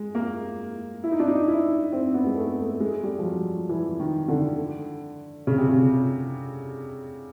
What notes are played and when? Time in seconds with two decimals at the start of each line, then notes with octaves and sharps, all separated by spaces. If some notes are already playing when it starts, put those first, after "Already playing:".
Already playing: G#3
0.15 A#3
1.03 E4
1.12 D#4
1.20 D4
1.28 D#4
1.48 E4
1.92 C4
2.14 B3
2.26 G#3
2.37 A3
2.58 A3
2.80 G#3
3.03 G3
3.19 F3
3.25 F#3
3.69 E3
4.00 D#3
4.28 D3
5.47 C#3
5.58 C3
5.69 C#3